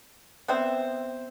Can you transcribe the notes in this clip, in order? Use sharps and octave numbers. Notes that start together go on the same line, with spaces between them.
B3 C4 E5